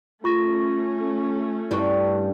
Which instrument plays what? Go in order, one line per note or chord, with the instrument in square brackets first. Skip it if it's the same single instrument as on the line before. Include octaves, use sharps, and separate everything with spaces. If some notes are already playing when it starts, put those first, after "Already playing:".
[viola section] A3 C#4 [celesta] F4 C#6 A#6
[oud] G2 G3 [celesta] E4 C#6